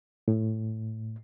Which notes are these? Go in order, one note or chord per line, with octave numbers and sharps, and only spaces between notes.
A2